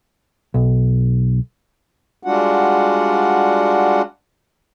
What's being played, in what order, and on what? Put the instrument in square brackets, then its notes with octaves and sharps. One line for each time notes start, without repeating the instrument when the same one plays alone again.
[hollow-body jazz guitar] B1
[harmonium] G3 G#3 D4 F4 F#4 F#5